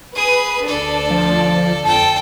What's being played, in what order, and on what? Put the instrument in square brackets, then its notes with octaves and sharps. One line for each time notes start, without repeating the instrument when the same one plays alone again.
[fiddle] G#4 D#6 [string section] B4
[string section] D2 D4 A5 [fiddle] A4 D5
[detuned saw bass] F3
[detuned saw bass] F2 [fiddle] A4 G5 [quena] A5